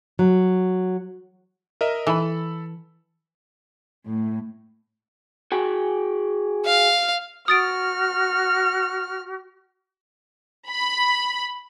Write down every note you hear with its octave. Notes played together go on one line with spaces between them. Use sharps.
F#3
A#4 D#5 E5
E3 A4 B5
A2
F#4 G#4 G5
F5
F#4 D#6 F6 A6 D7
B5